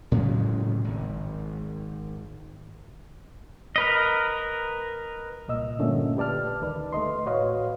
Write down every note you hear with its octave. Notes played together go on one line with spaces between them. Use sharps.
A2 C#3 F#3 G#3
G#1
A#4 B4 D#5
C2 A#2 D#5 E6
G2 A#2 D3 A3 C#4
G4 B4 D5 A5 F6
D2 D#3 B4 D5
A3 B4 D#5 C6
A2 F#4 B4 C#5 D#5 F5